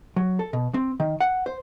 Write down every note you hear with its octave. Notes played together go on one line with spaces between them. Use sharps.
F#3
A4
B2
C4
D#3
F#5
C5